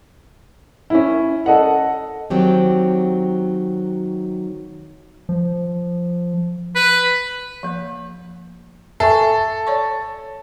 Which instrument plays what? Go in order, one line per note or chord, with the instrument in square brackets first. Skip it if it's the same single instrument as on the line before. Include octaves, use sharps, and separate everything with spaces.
[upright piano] C#4 E4
A4 D#5 F#5
[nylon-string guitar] D#3 F#3 C4 G4
[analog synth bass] F3
[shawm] B4
[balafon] F3 A#3
[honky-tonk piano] A4 [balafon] E5 G#5 C#6
[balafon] C#5 D5 C#6